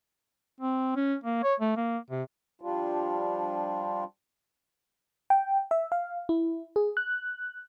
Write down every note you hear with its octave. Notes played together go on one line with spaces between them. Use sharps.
C4
C#4
A#3
C#5
A3
A#3
C3
F3 G3 D4 F4
G5
E5
F5
E4
G#4
F#6